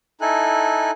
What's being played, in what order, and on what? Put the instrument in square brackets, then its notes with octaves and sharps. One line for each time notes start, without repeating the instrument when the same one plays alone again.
[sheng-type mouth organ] D#4 E4 A4 G#5 F#6